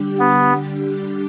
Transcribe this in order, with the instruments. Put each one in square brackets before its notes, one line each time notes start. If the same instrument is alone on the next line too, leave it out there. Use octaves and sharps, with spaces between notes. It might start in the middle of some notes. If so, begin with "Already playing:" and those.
Already playing: [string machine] D3 G3 D4 G4
[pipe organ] B3